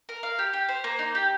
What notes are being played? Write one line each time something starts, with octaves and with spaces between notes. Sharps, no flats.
A#4
F5
G4
G4
C5
A#3
D#4
G4